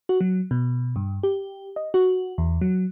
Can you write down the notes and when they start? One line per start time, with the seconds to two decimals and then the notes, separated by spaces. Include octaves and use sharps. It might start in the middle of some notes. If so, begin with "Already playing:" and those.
0.09 F#4
0.21 F#3
0.51 B2
0.96 G2
1.23 G4
1.76 D#5
1.94 F#4
2.38 E2
2.61 F#3